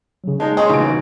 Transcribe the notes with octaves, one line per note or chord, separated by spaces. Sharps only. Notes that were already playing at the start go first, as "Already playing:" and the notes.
C#3 F#3
G#3 A#3 D#4 A5
G#3 A#3 C#4 F#4 G#4 C#5 C6
D#1 C#3 E3 D#4 D7